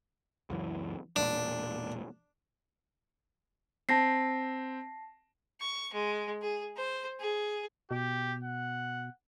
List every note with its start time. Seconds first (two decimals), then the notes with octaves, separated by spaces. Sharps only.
0.50 C#2 F#2 E3
1.16 E1 A#2 D4
3.89 C4 A5 A#6 C7
5.60 C#6
5.93 G#3
6.42 G#4
6.76 C5
7.20 G#4
7.91 B2 G4
8.44 F#5